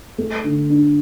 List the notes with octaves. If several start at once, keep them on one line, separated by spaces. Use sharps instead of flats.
A3
D3
D4